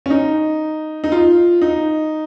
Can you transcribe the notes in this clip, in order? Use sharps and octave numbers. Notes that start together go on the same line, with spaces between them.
C#4
D#4
D#4
F4
D#4